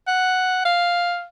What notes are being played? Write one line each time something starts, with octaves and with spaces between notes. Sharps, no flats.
F#5
F5